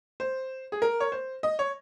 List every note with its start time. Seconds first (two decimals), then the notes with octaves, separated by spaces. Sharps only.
0.20 C5
0.72 G#4
0.82 A#4
1.00 C#5
1.12 C5
1.43 D#5
1.59 C#5